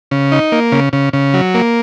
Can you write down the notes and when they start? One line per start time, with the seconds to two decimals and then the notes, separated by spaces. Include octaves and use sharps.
0.11 C#3
0.32 D#4
0.52 A#3
0.72 C#3
0.93 C#3
1.13 C#3
1.34 F#3
1.54 A#3